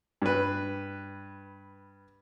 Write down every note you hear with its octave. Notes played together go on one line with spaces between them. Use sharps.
G2 B4